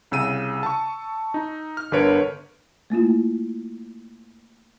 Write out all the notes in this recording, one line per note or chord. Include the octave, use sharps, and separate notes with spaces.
C2 C#3 E6 D#7
A5 C#6
D#4
F6
G1 D3 A#4 B4 C#5 D7
A3 A#3 E4 F4